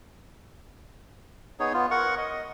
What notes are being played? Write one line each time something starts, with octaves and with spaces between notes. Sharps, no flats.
B3 D#4 G#4 C#5
B3 F4
A#4 F#5 C#6
D#5